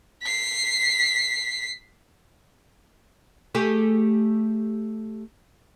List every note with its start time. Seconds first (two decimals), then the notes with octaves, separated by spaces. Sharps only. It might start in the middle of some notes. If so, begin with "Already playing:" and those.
0.23 B6 C7
3.55 A3 G4 G#4